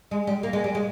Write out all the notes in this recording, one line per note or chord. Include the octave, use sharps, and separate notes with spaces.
G#3
G3
A#3
G#3
G3
G#3